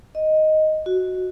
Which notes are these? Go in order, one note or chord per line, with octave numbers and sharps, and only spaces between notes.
D#5
F#4